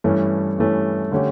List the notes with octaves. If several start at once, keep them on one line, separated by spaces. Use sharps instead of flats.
G2 E3 A3 C#4
G2 E3 A3 C#4
D3 A3 C#4 G4